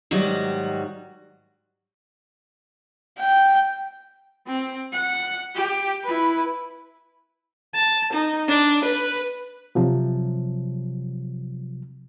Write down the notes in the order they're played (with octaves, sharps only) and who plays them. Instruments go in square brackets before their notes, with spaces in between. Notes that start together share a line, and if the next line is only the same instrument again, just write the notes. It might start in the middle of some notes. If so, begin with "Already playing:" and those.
[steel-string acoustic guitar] G#2 D#3 F#3 G3 F#4
[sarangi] G5
[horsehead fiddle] C4
F#5
G4
E4 B4
[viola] A5
D#4
D4
B4
[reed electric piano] C3 F3 F#3